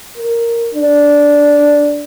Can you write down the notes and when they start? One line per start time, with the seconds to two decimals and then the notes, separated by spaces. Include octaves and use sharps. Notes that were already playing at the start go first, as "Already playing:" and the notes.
0.16 A#4
0.74 D4